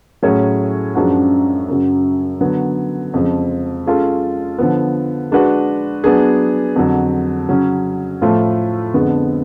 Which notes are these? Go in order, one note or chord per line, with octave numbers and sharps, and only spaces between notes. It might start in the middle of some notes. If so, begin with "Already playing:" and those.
A2 F#3 C#4 G#4 C#5
F#2 F3 G#3 D4 F#4
F#2 C#3 F#3
D3 F#3 B3
F2 C#3 F3 G#3
G#3 C#4 F4 A4
D3 F3 B3
G#3 D4 F#4 B4
F#3 B3 D4 G#4
F2 D3 F#3
C#3 F#3 C#4
A2 F3 A3 F4
F2 D3 G#3 B3